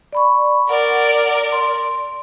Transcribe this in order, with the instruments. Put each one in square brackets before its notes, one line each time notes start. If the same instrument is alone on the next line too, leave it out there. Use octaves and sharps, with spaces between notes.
[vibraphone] D5 B5 C#6
[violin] A#4 D5 [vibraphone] F#5
[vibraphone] C6